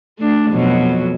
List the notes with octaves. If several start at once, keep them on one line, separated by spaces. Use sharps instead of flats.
A3 D4
F2 B2 F#3